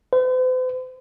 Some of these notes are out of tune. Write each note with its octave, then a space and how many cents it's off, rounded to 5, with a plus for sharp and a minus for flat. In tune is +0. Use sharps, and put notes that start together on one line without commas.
C5 -45